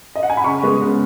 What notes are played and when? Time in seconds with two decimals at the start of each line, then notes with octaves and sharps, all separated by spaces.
0.16 D#5
0.23 F#5
0.30 G#5
0.37 B5
0.44 C#3 C#6
0.63 G#3 B3
0.81 C#3